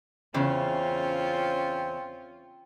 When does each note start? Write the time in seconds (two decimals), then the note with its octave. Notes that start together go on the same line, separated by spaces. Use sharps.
0.34 E2 C#3 C4 C#4 F4